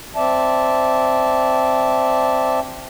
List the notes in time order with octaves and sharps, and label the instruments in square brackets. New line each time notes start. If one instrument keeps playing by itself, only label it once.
[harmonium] C4 D5 E5 A5